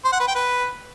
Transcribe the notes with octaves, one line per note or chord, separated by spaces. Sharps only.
C5
F#5
B4
G5
B4